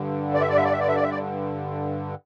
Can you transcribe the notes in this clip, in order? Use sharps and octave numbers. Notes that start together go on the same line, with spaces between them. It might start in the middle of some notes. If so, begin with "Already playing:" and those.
Already playing: G2 D3
D5
E5
D5
E5
D5
E5
D5
E5
D5
E5
D5